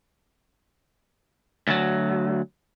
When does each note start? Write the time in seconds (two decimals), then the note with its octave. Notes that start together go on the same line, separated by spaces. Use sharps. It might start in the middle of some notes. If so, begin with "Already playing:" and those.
1.68 D2 F#3